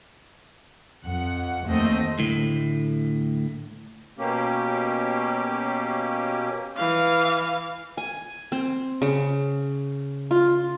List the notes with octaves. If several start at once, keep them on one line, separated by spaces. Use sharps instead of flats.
F2 F#5
D#2 A3 C4 D#5
D2 A2
B2 A#3 C#4 G4
E3 F5
G#5
C4
C#3
F4